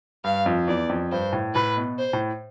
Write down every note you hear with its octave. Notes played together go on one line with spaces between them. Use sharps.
G2 F5
F2
E2 D5
F2
G2 C5
A2
A2 B4
B2
C5
A2